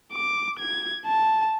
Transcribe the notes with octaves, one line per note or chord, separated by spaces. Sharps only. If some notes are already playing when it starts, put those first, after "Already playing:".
D6
G#6
A5